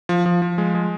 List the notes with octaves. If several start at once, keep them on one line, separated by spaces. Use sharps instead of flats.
F3
F3
F3
G#3
G#3